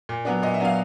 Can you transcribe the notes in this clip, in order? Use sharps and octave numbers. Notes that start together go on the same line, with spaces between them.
A#2
F#3 B3 D4
A#2 D#5
E5
F#3 B3 D4 F5